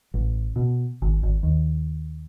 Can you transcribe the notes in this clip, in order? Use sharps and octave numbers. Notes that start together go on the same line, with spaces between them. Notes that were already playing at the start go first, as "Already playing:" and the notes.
A1
B2
G#1
G#1
D#2